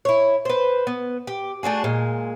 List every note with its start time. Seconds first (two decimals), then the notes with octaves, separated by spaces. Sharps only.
0.05 E4 C#5
0.45 B4 C5
0.87 B3
1.27 G4
1.63 A3 D4 F#4 G#4
1.84 A#2 G#3